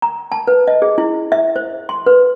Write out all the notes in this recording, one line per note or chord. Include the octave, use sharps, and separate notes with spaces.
A#5
A5
B4
D#5
G#4
E4
E5
C5
C6
B4